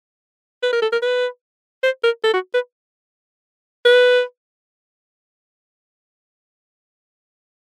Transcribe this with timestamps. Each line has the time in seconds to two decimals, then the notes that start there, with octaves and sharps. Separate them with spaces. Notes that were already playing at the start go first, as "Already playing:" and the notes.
0.63 B4
0.73 A#4
0.82 A4
0.92 A#4
1.02 B4
1.83 C5
2.04 A#4
2.24 A4
2.34 F#4
2.54 B4
3.85 B4